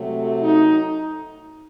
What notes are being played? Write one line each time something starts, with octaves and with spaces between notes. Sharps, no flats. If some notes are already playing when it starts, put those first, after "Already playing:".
Already playing: C3 F#3 A3
D#4